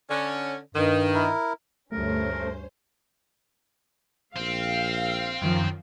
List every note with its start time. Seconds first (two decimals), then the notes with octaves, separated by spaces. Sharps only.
0.10 D3 C#4
0.75 G2 D#3
1.14 E4 A#4
1.92 D2 G2 A3 C#4 A#4 C5
4.36 A#1 C4 F5
5.42 F#2 D#3 F3